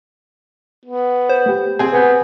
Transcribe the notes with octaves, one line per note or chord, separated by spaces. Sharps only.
B3
C5
A3 G4
C4 G#4
B3 B4 G#5 G6